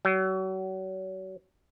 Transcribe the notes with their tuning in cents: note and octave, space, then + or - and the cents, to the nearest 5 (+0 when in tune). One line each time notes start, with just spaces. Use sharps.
F#3 +35